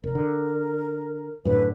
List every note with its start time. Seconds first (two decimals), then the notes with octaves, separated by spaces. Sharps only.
0.04 F1 A#4
0.15 D3
1.45 F#2 A2 D3 B4